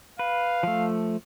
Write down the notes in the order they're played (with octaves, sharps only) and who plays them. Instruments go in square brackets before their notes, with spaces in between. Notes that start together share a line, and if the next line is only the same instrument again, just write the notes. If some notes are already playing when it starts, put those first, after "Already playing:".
[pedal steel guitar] B4 [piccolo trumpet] F5
[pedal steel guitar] F3 A3